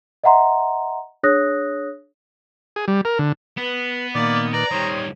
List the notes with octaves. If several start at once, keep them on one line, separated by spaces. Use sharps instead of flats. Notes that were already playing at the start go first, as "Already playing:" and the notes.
D#5 E5 F#5 A#5 C6
D4 G#4 C#5 D#6 F#6 A#6
G#4
G3
A#4
D3
B3 B4
A#2 D#3 A#3 D5
B4 D5 A#5
D#3 G3 C5 C#5 D#6